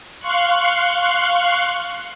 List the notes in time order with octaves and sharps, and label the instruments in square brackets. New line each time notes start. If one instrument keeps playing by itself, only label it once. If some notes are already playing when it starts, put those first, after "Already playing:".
[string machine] F5 C6 C#6 F#6